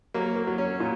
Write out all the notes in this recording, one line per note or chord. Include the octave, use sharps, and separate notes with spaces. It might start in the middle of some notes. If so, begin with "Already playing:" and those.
F#3 A#3
A#3
F#3
C#4
A#2